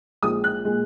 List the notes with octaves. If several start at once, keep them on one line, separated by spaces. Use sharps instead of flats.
A#1 A#2 G#3 D#6
F#6
A#2 G#3